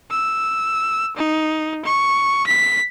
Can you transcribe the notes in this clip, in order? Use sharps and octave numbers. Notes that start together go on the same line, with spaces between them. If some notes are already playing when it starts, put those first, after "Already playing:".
E6
D#4
C#6
B6